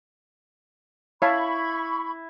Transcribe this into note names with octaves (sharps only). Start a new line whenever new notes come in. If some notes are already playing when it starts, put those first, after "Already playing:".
E4 C#5 F5 A5 B5 C#6